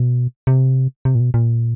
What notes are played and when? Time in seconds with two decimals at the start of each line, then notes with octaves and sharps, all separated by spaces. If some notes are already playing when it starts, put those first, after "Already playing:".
Already playing: B2
0.47 C3
1.05 C3
1.15 A#2
1.20 B2
1.34 A#2